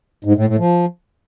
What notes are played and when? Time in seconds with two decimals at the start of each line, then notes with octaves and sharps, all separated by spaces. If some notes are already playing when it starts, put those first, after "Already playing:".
0.25 G#2
0.36 A2
0.47 A2
0.59 F3